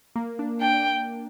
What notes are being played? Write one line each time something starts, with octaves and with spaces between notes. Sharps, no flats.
A#3
D4
D4 G5